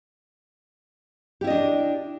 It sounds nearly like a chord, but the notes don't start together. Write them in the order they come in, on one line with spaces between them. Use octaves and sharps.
G4 E4 D#5 D4